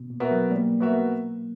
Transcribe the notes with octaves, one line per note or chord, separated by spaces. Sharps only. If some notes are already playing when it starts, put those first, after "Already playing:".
Already playing: B2
A#2
B3 F#4 A#4 E5
F#3
G3 A#3
B3 F#4 A#4 E5